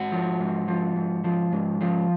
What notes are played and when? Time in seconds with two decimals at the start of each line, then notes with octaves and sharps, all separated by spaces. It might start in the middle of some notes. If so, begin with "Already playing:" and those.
Already playing: G#2 F#4
0.12 F3
0.40 G#2
0.68 F3
0.96 G#2
1.24 F3
1.52 G#2
1.81 F3